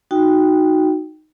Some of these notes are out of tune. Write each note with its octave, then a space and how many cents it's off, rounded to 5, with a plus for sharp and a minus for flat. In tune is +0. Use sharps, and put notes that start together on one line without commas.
D#4 +0 F#4 -5 G5 +5